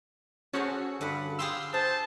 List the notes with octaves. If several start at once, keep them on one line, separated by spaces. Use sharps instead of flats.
C#4 F#4 G#4 A4 C5 C#5
G2 D3 F#5 B5
F4 G4 G#4 C6 E6
G#4 C5 A5